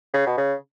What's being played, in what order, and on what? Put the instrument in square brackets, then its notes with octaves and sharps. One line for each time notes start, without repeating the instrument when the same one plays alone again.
[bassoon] C#3
B2
C#3